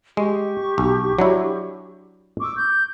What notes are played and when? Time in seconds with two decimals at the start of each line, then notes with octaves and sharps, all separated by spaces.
0.17 G#3 G4 C#6
0.78 B1
1.19 F#3 D4 E4
2.41 C#6 D6 E6
2.56 G6